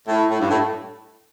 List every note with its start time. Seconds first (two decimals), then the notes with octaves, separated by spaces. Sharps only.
0.08 A2
0.30 A2
0.40 G2
0.49 A2